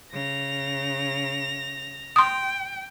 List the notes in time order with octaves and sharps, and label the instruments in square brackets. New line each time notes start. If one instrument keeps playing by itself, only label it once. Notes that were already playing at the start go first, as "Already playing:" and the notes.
[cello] C#3 [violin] A#6 F7
[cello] G5 [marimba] C6 D#6